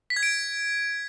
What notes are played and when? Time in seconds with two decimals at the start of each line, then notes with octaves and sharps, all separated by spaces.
0.10 B6
0.16 G#6
0.23 D7